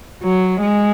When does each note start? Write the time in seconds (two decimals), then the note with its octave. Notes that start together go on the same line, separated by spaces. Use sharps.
0.23 F#3
0.61 G#3